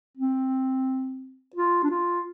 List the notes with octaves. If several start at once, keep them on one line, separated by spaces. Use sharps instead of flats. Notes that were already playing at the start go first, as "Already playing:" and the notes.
C4
F4
D4
F4